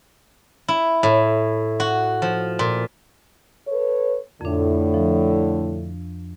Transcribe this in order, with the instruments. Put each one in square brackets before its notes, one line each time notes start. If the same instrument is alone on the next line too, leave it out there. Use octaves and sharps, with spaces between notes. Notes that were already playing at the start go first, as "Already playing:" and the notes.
[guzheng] E4
A2
F#4
F3
A#2
[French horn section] A4 B4 C#5
[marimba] F2 D4 [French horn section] A2 D3
[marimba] F3